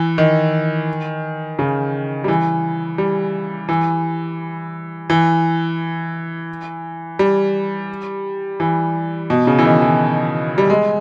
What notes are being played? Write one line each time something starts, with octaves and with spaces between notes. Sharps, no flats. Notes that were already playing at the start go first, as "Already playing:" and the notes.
Already playing: E3
D#3
C#3
G3
E3
G3
E3
E3
G3
E3
B2
C#3
E3
D#3
E3
G3
G#3